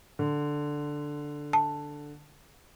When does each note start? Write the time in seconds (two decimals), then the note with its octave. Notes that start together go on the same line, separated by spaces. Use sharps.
0.19 D3
1.53 A5